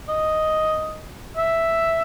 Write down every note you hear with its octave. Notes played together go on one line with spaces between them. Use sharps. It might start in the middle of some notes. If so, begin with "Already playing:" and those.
D#5
E5